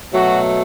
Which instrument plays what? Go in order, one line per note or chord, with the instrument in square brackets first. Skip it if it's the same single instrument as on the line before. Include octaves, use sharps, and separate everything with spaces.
[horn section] B2 F#3 A3 F#4